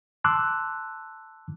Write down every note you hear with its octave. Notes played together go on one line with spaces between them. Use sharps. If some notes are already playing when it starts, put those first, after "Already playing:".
A5 C6 D6 E6 F#6